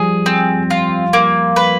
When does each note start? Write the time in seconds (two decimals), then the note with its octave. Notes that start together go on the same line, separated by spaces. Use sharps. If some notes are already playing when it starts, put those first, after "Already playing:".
Already playing: F3 G3 G#4
0.26 C4
0.70 F4
1.13 A#3
1.56 B4